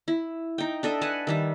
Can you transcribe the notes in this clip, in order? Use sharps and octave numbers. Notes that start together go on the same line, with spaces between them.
E4
D#4 G5
D4 A4 D#5 E5
B4 F#5 G#5 A5
D#3 G3 E5